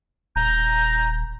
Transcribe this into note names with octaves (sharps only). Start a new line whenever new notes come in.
D#1 A#5 G6